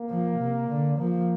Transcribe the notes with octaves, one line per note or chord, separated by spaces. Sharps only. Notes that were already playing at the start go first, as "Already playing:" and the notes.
Already playing: A#3
F3
C3
D3
F3 A#3